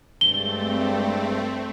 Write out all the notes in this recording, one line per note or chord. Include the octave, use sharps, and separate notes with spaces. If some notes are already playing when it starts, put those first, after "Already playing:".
G2 G#3 A3 C4 A6 G7